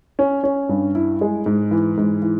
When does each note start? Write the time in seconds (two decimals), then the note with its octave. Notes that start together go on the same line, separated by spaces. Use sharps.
0.19 C#4
0.44 C#4
0.69 G2
0.95 E4
1.21 G#3
1.46 G#2
1.71 E3
1.97 G#2
2.22 E3